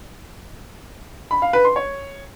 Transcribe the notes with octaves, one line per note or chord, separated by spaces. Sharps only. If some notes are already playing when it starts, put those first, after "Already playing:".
B5
F5
B4
C6
C#5